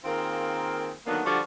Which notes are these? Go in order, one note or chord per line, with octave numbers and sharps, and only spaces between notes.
D#3 A#3 C4 F4 G#4 A#4
D3 D#3 F#3 A#3 B3 D4
D3 F3 G3 F#4 D5